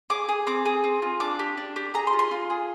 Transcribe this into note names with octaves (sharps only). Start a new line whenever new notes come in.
G#4 D6
G#4
C4 D6
G#4
C4
F4
D4 D6
G4
D4
G4
G#4 A#5
C6
F4
C6
F4
G#4